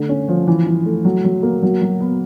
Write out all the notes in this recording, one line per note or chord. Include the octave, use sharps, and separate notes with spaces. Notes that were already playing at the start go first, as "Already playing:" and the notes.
Already playing: D3 A3
C#4
F3
E3
E3
A3
F#3
F#3
A#3
F#3
F#3
B3